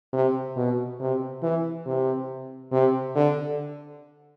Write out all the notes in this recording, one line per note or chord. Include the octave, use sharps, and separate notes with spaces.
C3
B2
C3
E3
C3
C3
D3